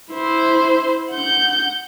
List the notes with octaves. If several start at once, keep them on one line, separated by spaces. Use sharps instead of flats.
E4 C5
F#5 G6